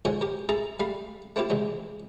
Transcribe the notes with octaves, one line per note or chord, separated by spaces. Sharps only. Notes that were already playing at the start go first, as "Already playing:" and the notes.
G#2 D3 F3 F#4 C#5 G#5
G4 A#4
G#4 A4 E5 A#5
G3 A3 F5 B5
A3 A#3 C4 E4 F4 G4
A1 E2 C#3 G#3